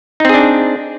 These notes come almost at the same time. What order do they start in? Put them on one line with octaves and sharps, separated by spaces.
D#4 C4 G#4 D4